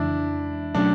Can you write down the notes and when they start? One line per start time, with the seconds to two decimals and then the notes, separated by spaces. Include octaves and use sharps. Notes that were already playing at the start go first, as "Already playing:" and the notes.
Already playing: F2 C#3 E3 G#3 D4 E4
0.75 B2 F#3 A3 C#4 D4